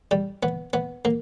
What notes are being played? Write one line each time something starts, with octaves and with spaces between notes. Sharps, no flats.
G3
B3
B3
A#3